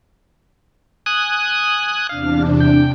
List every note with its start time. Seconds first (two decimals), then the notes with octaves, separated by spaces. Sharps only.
1.06 G#5 D#6 F#6
2.09 E2 C3 D4 F5
2.61 G5